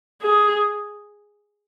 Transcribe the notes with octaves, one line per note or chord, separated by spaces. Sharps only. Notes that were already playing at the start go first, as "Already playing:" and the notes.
G#4